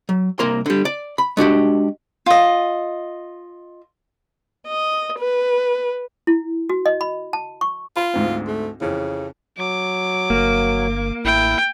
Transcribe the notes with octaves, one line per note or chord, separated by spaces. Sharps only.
F#3
C2 A#3 A#4 C6
D3 G3
D5
B5
G#3 D4 F#4 G4
F4 D#5
D#5
B4
E4
F#4
D#5
B5
A5
C#6
F4 B5 C6
D2 G#2 C4
A3
F2 C#3 E3
F#3 D6
G1 A#3
A1 E4 G5